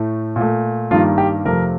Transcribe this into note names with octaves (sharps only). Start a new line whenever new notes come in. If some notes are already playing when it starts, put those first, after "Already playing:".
Already playing: A2 A3
A#2 A3
G2 D#3 G3 A#3 F4
G4
F2 C3 F3 A3 A#4